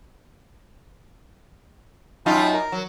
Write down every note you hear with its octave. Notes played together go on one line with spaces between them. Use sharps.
F#2 D#4 F4 G5 A5 B5
A#4
F#3